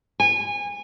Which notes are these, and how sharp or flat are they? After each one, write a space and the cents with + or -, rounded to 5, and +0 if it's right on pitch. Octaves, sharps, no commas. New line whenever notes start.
G#5 -25